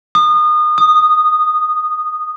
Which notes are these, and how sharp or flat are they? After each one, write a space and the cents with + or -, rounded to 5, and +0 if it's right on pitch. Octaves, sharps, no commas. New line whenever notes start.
D#6 -30
D#6 -10